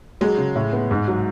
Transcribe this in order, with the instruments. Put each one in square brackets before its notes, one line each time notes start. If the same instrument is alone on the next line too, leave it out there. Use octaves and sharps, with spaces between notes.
[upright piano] F#3 [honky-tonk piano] G#3
[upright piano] C#3
A2
B3
G#2
F#3